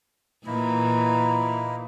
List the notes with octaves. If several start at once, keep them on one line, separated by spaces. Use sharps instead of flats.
A#2 E3 A#3 D#4 E4